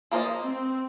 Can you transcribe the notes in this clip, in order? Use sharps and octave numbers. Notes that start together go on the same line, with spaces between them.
F3 A#3 F4 C5 D#5
C4